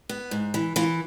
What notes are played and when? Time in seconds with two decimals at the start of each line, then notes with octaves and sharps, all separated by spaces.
0.09 B3
0.31 G#2
0.54 E3
0.76 E3 F4